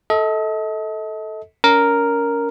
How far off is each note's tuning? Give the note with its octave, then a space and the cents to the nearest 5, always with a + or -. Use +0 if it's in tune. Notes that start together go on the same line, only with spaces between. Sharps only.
A4 -5 D#5 +40
C#4 +30 A#4 +0